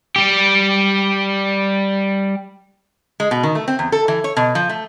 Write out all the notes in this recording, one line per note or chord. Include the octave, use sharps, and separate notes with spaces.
G3 G4
G#3
B2
D#3
A3
C4
E2
A4
E3
C#5
B2
F3
A3